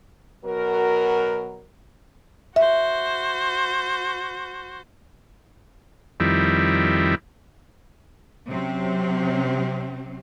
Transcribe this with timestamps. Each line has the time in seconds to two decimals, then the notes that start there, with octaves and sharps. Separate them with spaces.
0.45 B2 F#3 F#4 A#4
2.56 F#4 C5 E5
6.20 F2 D#3 G3 E4
8.49 C3 F#3 C4 C#4